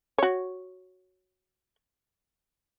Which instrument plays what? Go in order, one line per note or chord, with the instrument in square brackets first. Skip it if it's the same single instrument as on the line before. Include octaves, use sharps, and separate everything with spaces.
[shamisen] F#4 C#5